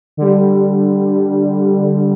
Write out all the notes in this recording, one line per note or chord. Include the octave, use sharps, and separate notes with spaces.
D3 G3